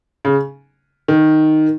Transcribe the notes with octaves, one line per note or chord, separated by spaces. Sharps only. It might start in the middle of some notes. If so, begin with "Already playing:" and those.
C#3
D#3